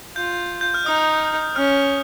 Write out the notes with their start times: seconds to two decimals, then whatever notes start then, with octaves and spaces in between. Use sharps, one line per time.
0.15 F4 G6
0.61 G6
0.74 F6
0.86 D#4 D#6
1.56 C#4 F6